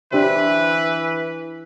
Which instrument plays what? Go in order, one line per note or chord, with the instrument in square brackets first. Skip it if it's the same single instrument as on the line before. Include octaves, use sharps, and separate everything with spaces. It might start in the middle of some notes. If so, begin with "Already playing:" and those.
[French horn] E3 [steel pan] D4 G4 C5 [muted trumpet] B4 [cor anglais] E5